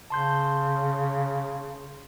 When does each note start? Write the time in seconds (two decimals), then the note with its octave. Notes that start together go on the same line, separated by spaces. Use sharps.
0.10 C#3 A5 C6 G6